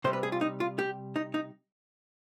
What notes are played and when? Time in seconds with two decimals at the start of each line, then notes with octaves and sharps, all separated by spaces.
0.04 C3 G3 C5
0.13 B4
0.23 G#4
0.32 F4
0.41 D#4
0.60 F4
0.79 G4
1.16 D#4
1.34 D#4